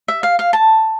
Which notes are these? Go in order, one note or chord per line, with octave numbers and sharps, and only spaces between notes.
E5
F5
F5
A5